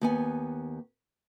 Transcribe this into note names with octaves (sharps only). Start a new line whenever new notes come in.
D#2 B3 G#5